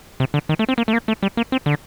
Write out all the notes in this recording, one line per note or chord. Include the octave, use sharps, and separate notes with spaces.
C3
D3
D#3
A3
C4
A#3
A3
A#3
A3
G3
A#3
C4
D3